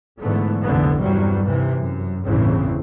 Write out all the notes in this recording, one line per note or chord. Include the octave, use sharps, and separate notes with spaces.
G#2 D3 E3 A3 B3
F1 B1 D3 E3 B3
G1 E2 G2 C3 F#3 G3
D#2 C3 E3
F#2
G1 E2 A2 C#3 E3 C4